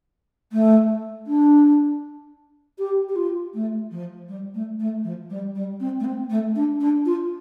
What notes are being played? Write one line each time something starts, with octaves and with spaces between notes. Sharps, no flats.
A3
D4
G4
G4
F4
A3
F3
G3
A3
A3
F3
G3
G3
C4
A3
C4
A3
D4
D4
F4